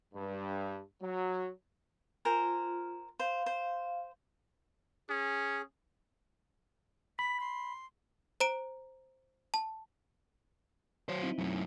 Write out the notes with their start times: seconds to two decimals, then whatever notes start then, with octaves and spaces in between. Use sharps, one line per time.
0.14 G2
1.01 F#3
2.25 F4 A#4 C5 G#5
3.19 C5 F5
3.46 C5
5.09 C#4 G#4
7.19 B5 B6
7.40 C6
8.40 C5 A#5 D7
9.54 A5
11.09 F#3 C5 C#5
11.22 C4 D#4 E4
11.38 F#2 A3